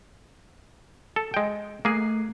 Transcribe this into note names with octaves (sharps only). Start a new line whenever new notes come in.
A4
G#3 G5
A3 A#3 G#4 C7